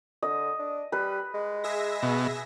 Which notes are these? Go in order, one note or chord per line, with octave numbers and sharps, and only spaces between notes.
D3 D#5
D4
G3 B4
G#3
G#4 E5 A#6
B2